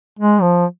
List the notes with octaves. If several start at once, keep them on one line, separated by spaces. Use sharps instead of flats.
G#3
F3